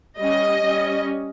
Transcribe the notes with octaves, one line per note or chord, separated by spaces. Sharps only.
G3 C#4 D#5
G3 C#4